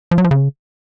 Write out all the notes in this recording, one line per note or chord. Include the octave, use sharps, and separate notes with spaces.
F3
F#3
F3
C#3